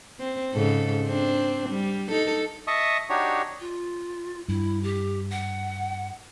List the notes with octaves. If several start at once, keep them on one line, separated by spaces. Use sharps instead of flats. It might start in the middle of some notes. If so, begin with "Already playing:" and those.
C4
G#2 C#3 A4
C4 D4
G3
D#4 A4
D#5 E5 A5 C#6 D#6
D4 D#4 F#4 G4 C#5
F4
G2 E4
G4
F#5